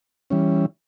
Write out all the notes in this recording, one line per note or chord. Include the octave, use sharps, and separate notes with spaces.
E3 G3 C#4